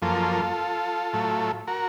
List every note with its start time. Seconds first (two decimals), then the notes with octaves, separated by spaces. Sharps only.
0.02 F#2 F3 A#3 F4 A4
1.13 A2 F#3 A3
1.67 F#4 A#4